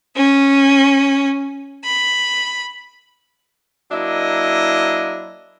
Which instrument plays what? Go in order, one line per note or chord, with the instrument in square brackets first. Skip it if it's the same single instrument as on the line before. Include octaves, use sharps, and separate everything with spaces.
[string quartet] C#4
B5
[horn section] F#3 A#3 D4 E4 D#5